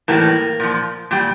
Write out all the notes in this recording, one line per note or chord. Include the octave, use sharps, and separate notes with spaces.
A2 E3 G3 A#3
A#2 F3
A#2 G3